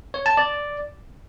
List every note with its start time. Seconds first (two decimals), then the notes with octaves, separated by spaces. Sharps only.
0.14 C#5
0.26 A5
0.37 D5